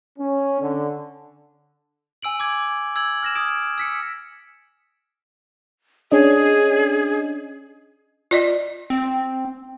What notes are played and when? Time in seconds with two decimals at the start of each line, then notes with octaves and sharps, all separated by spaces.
0.19 C#4
0.61 D3
2.22 G#5 E6 D7 F#7
2.40 D6 G#6
2.96 E6 G#6 F#7
3.23 F6 A#6 E7
3.35 D#6 F6 G#6 D7 E7
3.78 E6 B6 C#7
6.11 C#4 D4 G#4 D#5
8.31 F4 D5 D#5
8.90 C4